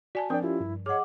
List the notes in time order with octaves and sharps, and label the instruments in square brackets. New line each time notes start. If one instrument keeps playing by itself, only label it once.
[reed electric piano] F#4 [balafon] D5 G#5 A5
[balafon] F3 A#4 [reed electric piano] C4 D4 D5 [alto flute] G5
[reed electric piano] C#4 F4 G4 [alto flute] E4
[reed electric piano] G2
[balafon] G#4 D#5 [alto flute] C#5 [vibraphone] F#5 D6